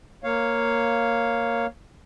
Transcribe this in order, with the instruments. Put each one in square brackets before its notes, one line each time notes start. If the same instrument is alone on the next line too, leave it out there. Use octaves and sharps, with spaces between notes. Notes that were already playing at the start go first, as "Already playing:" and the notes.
[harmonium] A#3 C#5 F5